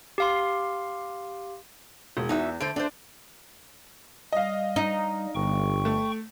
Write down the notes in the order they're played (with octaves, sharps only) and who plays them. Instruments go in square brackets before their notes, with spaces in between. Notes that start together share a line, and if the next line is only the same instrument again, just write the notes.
[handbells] G4 F5 C6
[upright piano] E1
[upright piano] E2 [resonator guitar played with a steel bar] D#4 F#4 E5
[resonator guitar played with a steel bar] D3 A3 C5 [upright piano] D7
[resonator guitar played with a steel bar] A3 C5 [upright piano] D4
[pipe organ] G3 [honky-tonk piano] D#5 F5
[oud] D#4
[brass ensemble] G1 [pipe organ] G5 C#6
[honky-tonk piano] A3